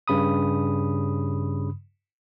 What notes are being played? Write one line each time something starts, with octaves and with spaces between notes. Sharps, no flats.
G2 C#3 B5 D#6